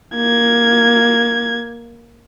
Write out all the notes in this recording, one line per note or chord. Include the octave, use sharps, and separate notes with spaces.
A#3 G#6